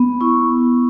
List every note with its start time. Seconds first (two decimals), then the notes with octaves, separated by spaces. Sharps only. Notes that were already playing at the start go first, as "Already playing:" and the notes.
Already playing: B3
0.21 E4 C#6